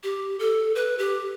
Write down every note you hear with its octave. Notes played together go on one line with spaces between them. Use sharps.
G4
A4
B4
G4